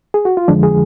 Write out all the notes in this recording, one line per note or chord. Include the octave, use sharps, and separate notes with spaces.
G#4
F#4
F4
F2 D3 F3 G#3 D4
G#4